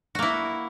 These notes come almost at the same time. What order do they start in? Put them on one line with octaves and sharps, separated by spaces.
F#4 A#3 E4